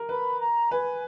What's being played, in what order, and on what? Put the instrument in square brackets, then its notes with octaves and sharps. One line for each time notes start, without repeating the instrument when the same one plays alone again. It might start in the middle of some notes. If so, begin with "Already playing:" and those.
Already playing: [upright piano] A#4
[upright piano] B4 [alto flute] B5
[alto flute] A#5
[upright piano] B4 [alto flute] G#5